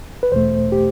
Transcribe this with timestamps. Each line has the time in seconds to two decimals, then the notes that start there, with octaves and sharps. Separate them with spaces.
0.23 B4
0.32 E2 B2 A3 C5
0.72 G4